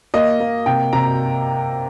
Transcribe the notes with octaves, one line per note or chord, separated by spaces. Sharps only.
A#3 D#5
A#3
C3 G5
C3 A#5